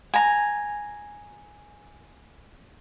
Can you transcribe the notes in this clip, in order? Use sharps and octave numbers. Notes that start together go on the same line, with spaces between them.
G#5 A#5